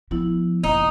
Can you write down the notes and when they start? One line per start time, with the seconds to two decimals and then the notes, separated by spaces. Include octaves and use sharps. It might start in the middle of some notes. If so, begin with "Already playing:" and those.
0.11 F3 B3 E4
0.64 F#1 D#4